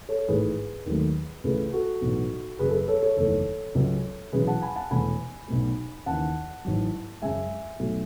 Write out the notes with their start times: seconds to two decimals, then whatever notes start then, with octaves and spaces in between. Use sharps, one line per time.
0.09 A4 C#5
0.28 A1 G#2 E3 A3 G#4 B4
0.86 D#2 D#3 F#3 A3
1.44 C#2 C#3 E3 A3 G#4 B4
1.73 F#4 A4
2.01 B1 A2 E3 B3
2.59 F#1 F#2 C#3 G#4 B4
2.69 A4
2.73 G#4 B4
2.88 A4 C#5
3.02 A4 C#5
3.17 F#1 E2 D#3 A3 A4 C#5
3.75 C#2 C#3 F#3
4.33 E1 E2 C#3 F#3 G#4 B4
4.47 F#5 A5
4.62 G#5 B5
4.76 F#5 A5
4.90 E1 E2 B2 A3 G#5 B5
5.48 B1 B2 A3
6.06 D#2 C#3 E3 F#5 A5
6.65 A1 G#2 F#3
7.22 F#2 C#3 G#3 E5 G#5
7.79 B1 B2 F#3 A3